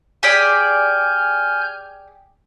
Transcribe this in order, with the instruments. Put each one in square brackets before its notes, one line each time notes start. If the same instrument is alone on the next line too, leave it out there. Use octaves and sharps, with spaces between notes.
[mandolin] G4 G#4 D5 [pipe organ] G#5 F6 G6